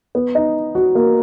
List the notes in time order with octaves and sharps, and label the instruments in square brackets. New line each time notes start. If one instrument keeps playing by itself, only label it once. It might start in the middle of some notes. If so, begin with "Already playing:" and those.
[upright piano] B3
D#4
F#4
A#3